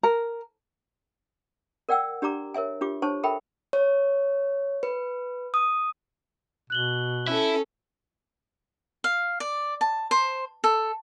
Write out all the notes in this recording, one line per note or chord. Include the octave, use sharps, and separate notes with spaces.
A#4
A#4 D5 F#5 G5 E6
D4 G4 D5 A#5 D6
A#4 C#5 E5 G#5
D4 F4 G4 D6
D4 C5 C#5 G#5 A5 C#6
A4 A#4 E5 G5 B5
C#5
B4
D#6
B2 F#6 F#7 G7
C#4 E4 A4
F5
D5
A5
C5
A4